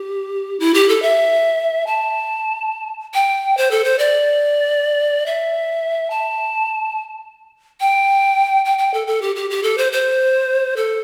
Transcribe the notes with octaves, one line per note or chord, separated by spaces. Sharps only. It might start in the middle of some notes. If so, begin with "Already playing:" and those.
Already playing: G4
E4
G4
A4
E5
A5
G5
C5
A4
C5
D5
E5
A5
G5
G5
G5
A4
A4
G4
G4
G4
A4
C5
C5
A4